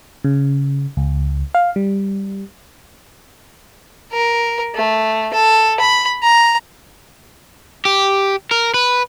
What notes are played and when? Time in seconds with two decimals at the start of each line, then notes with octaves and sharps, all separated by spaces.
0.24 C#3
0.97 C#2
1.55 F5
1.76 G3
4.12 A#4
4.75 A3
5.33 A4
5.80 B5
6.23 A#5
7.85 G4
8.51 A#4
8.74 B4